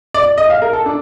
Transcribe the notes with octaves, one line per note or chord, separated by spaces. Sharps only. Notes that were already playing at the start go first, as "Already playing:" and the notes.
D5
D#5
F5
A#4
A4
D4